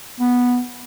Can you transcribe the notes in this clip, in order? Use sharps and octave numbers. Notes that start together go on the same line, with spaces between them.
B3